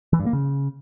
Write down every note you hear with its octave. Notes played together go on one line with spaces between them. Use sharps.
E3
G2
A#3
C#3